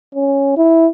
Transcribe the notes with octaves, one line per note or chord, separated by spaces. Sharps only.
C#4
E4